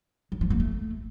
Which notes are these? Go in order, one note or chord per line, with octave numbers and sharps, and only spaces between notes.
F#3
F3
A#3
A3